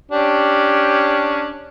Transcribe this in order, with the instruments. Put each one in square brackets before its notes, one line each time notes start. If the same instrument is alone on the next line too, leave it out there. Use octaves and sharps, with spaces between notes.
[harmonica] C#4 D4 G4